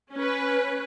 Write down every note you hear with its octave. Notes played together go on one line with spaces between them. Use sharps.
C#4 B4